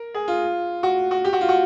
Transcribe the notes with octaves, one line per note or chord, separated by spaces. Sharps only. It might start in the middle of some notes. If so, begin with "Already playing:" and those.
Already playing: A#4
G#4
F4
F#4
F#4
G4
F#4
F4
F#4